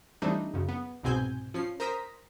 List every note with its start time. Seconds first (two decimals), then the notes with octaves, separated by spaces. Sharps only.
0.22 E3 G3 A3 C4 D4 D#4
0.54 F#2 C#3
0.69 B3
1.03 C2 G#2 B2 C4 G#5 G6
1.54 F3 C#4 C7
1.80 A#4 C5 A#5 D#6 B6